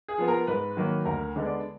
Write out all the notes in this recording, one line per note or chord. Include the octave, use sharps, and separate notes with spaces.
G#4
F3 B3
A#4
G#2 B4
D#3 F#3 A#3
D2 A#4
D3 G#3 B3
D5